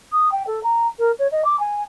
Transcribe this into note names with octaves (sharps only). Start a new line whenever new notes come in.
D#6
G5
A4
A#5
A#4
C#5
D#5
D6
G#5